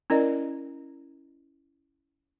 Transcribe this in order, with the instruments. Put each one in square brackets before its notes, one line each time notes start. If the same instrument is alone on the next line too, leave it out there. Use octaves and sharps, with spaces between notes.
[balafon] C#4 E4 A#4 D5 D#5